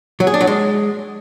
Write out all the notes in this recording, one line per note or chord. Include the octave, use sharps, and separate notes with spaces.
F#3
G#4
D4
F#3
G#3